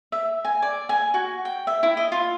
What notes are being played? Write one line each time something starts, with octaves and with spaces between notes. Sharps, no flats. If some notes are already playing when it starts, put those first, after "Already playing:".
E5
G#5
D5
G#5
F#4
G5
E5
E4
D#5
F4